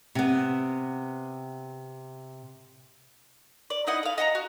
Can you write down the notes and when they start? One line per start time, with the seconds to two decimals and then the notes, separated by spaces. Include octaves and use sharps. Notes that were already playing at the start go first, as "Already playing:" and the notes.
0.15 C3 B3
3.70 D5
3.87 D#4 E4 D#5 F#5
4.03 A4 F5
4.18 D#5 F#5 A5 A#5
4.35 F#4